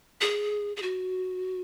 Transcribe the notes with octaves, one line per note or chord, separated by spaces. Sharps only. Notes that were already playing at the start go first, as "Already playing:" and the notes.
G#4
G#4
F#4